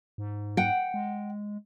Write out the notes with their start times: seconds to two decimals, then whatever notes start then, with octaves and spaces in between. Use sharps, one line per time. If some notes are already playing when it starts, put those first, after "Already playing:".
0.18 G#2
0.57 F#5 G5
0.94 G#3